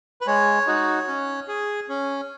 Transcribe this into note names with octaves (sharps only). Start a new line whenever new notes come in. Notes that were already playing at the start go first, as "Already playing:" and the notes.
B4
G#3 C#5
D#4 F#4
C#4
G#4
C#4